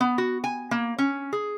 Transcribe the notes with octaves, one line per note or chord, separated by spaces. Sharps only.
B3
F#4
G#5
A#3
C#4
G#4